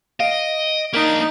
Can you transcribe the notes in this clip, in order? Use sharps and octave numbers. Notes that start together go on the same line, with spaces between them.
D#5 F5 D7
A#3 D4 D#4 A#4 B6 D7